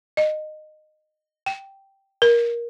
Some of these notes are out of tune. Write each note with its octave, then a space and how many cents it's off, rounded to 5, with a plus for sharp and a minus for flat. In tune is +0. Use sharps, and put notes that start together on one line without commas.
D#5 -15
G5 -5
A#4 +15